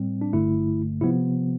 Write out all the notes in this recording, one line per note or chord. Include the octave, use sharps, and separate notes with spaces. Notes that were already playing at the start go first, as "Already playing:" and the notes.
Already playing: A2 G3 C4
D4
G1 G2 D3 A3 E4
C3 F3 B3 E4